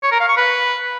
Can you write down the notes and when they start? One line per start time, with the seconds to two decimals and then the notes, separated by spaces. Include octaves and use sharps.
0.03 C#5
0.12 A#4
0.20 F5
0.29 C#6
0.37 B4